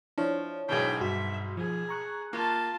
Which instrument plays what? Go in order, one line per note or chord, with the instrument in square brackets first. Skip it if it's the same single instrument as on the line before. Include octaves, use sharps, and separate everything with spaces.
[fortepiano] F3 [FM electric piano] D4 E4 C#5
[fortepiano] B1 G#2 B2 [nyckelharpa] G#4 G5
[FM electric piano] G2 F#4 C6 [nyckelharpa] E5
[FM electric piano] F3 [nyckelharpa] G#4
[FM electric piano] A#5 C#6 F#6
[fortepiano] A#3 [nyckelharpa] F4 A5